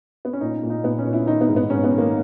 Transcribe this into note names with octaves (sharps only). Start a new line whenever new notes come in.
B3
C#4
A#2 D#4
A#2
D#4
A#2 B3
C#4
A#2
E4
D#3 D#4
B3
G#2
B3
G#2 C#4
B3
D#3
A#3